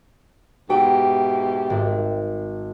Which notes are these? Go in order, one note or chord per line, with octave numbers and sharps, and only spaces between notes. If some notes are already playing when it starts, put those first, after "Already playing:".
G#2 B2 G4 E5 F#5 G5
G#1